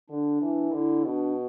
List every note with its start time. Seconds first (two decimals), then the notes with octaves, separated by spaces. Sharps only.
0.10 D3 D4
0.42 E3
0.73 D3 E4
1.04 B2 D4